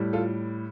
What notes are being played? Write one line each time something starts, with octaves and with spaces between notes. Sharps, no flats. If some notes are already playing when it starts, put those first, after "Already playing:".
Already playing: A2 G3
F4 A4